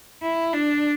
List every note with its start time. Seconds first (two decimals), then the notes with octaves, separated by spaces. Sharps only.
0.22 E4
0.53 D4